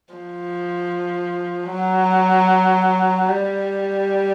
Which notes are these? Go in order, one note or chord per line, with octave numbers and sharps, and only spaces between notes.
F3
F#3
G3